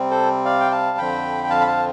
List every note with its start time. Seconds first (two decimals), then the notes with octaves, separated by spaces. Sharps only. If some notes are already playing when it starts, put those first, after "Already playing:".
Already playing: C3 G3 C4
0.11 A4 C5
0.45 D5 F5
0.60 G5
0.72 F5 A5
0.98 F2 D3 F3 C4 G5 B5
1.44 G5
1.50 F5 A5
1.61 B5
1.67 F5 A5